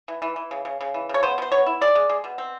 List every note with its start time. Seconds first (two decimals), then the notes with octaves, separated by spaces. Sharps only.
0.08 E3
0.22 E3
0.36 E3
0.51 C#3
0.65 C#3
0.81 C#3
0.94 E3
1.09 C#3 C#5
1.23 B3 C5
1.38 B2 C5
1.52 B3 C#5
1.66 E4
1.81 G#3 D5
1.95 G#3
2.10 G#3
2.24 B2
2.38 C4